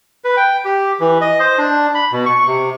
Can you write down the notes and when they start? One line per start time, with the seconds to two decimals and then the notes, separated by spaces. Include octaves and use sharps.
0.24 B4
0.37 G5
0.65 G4
1.00 E3
1.21 D#5
1.40 C5
1.58 D4
1.94 B5
2.12 B2
2.26 C#6
2.47 C3